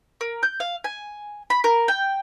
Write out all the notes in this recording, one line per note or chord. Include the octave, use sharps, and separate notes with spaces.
A#4
G6
F5
G#5
B5
A#4
G5